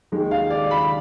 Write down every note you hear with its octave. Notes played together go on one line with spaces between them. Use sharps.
D#2 D#3 G#3
F5
D5
B5